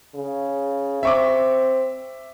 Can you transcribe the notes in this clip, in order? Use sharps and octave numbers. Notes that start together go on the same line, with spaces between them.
C#3
C4 E5 C#6 D6